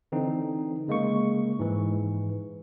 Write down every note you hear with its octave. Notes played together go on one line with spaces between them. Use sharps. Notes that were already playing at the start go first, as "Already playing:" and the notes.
D3 E3 C4 D#4
C#3 G#3 A#3 C#6
G#2 E3